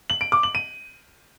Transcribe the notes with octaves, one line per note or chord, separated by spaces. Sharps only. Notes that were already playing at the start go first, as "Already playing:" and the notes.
F#7
D7
D6
F#7
D#7